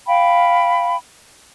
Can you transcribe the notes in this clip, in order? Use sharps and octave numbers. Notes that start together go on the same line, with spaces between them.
F5 G5 B5